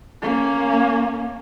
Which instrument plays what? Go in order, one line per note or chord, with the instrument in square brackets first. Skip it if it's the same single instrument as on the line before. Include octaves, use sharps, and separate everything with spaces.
[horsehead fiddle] A#3 C#4